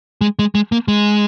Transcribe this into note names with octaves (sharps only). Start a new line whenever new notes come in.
G#3
G#3
G#3
A#3
G#3